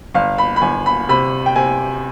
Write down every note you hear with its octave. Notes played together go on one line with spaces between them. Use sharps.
G1 F5
B5
B5
G1 G#5
B5
C3 B5
G5
C3 G#5